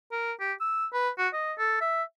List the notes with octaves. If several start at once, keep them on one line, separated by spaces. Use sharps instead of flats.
A#4
G4
E6
B4
F#4
D#5
A4
E5